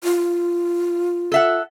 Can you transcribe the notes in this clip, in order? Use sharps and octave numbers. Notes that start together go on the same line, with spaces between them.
F4
A4 E5 F#5